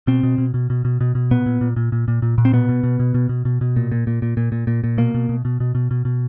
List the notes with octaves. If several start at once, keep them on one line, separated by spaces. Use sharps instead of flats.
B2 C4
B2
B2
B2
B2
B2
B2
B2
A#2 B3
A#2
A#2
A#2
A#2
A#2
A#2
A#2
C4
B2 B3
B2
B2
B2
B2
B2
B2
B2
A#2
A#2
A#2
A#2
A#2
A#2
A#2
A#2
B2 A#3
B2
B2
B2
B2
B2
B2
B2